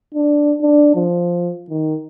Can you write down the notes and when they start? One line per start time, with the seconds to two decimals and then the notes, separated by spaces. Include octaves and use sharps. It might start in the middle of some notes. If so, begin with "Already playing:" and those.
0.15 D4
0.62 D4
0.95 F3
1.70 D#3